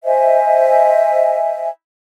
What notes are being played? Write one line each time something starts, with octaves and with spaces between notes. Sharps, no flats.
C5 D#5 E5 G#5